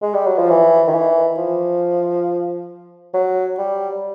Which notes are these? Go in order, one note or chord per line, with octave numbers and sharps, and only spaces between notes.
G#3
G3
F#3
F3
E3
D#3
E3
F3
F#3
G3